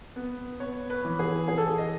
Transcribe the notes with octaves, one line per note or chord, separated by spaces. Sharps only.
B3
B3 C#5
B4
E3
G#4
E3 G#4
A4
G#4
D#5